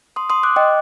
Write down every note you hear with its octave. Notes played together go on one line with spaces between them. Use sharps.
C6 D#6
C6 D#6
D6 F#6
D#5 G5